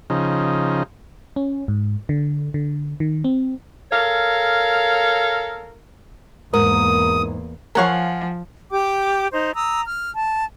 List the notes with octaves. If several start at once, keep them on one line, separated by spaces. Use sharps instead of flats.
C#3 F3 D#4
C#4
G#2
D3
D3
D#3
C4
A4 A#4 C#5 F5
E2 G#2 A#3 A#4 D#6
F3 A#4 C#5 F5 F#5 G#5
G4 G5 D6
D#4 C5
A#5 D#6 E6
F6
A5